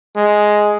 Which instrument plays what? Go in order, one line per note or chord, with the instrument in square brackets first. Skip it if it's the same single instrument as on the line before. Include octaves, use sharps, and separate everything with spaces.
[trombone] G#3